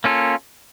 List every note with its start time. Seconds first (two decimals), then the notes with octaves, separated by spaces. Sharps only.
0.04 A#3 C#4 F4 A4